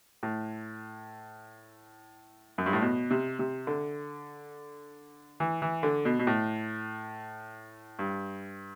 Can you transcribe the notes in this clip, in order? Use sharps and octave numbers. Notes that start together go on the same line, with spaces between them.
A2
F#2
G2
A2
B2
C3
C3
D3
E3
E3
D3
B2
B2
A2
G2